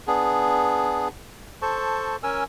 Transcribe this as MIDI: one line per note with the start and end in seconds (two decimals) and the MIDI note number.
0.07 1.09 59
0.07 1.09 62
0.07 1.09 68
1.62 2.16 69
1.62 2.16 72
1.62 2.16 81
1.62 2.16 85
2.23 2.44 61
2.23 2.44 70
2.23 2.44 80
2.23 2.44 88